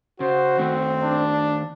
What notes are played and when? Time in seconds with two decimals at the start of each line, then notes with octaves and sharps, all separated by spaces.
0.20 C#3 F#4 C5
0.59 D#3 A3 C4
1.03 D4